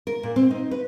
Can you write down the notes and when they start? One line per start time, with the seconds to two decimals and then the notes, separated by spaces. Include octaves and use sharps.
0.07 A#4
0.23 A#2
0.36 C4
0.51 D#4
0.71 B4